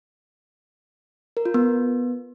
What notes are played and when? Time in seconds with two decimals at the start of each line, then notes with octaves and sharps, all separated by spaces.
1.37 A#4
1.45 F4
1.54 B3